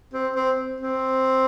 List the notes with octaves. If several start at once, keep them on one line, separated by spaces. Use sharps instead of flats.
C4
C4
C4